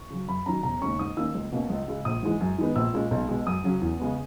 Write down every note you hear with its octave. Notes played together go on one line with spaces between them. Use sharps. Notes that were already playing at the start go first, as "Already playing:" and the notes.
Already playing: C#6
C#3 F#3
F#2 B5
D#3 F#3 C#4 A#5
E1 A#5
D#2 C#3 G#3 C#4 C#6
G#2 D#6
D#3 A#3 C#4 E6
C#2
B2 A#3 C#4
C#2
C#3 G#3
A#1 D#6
G#2 E3 G#3
F#2
D#3 G#3 B3
A#1 E6
A#2 G#3 C#4
B1
B2 G#3
F#2 D#6
C#3 F#3 C#4
E2
C#3 G#3 B3